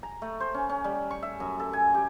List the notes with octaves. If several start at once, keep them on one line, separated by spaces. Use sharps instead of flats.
A#5
A3
C5
C#4
C#4
G3
C#6
E5
F#2
A4
G#5
G4